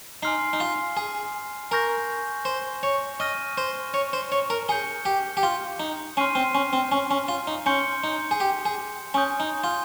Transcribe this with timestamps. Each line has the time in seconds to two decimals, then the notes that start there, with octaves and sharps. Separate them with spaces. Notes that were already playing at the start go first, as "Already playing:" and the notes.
0.23 D#4 G#5 C6 F6 C7
0.53 D#4
0.60 F4
0.97 G#4
1.71 A#4 G#5 C#6 G6 A#6
2.45 C5
2.83 C#5
3.20 D#5 C#6 F6 A#6 D#7
3.58 C5
3.94 C#5
4.13 C5
4.32 C#5
4.50 A#4
4.68 G#4 G6 C#7 G7
5.06 G4
5.37 G4
5.43 F4
5.80 D#4
6.17 C#4 C6 F6 C7 D#7
6.35 C4
6.55 C#4
6.73 C4
6.92 C#4
7.11 C#4
7.28 F4
7.47 D#4
7.66 C#4 C6 G6 C#7 G7
8.04 D#4
8.31 G#4
8.40 G4
8.65 G#4
9.14 C#4 G#5
9.17 D#6 G6
9.40 D#4
9.64 F4